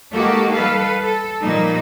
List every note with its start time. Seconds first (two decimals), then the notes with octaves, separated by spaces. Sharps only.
0.14 G#3 A#3 D#4 F#4 G4 A4
0.51 G3 A4 B4 F5
1.01 A4
1.41 A#2 F3 G3 A#3 D#4